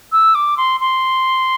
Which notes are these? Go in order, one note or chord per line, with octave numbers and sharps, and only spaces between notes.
E6
D6
C6
C6